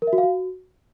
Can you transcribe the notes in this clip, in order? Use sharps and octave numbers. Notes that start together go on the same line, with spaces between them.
A#4
E5
F#4
F5
F#4